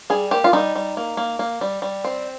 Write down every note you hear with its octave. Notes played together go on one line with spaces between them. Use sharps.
G3 G#4
A#3 G4
F4
G3 D#4
G3
A#3
A#3
A#3
G3
G3
C4